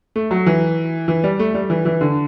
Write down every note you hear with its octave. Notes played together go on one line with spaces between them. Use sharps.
A3
F#3
E3
E3
G3
A3
G3
E3
E3
D3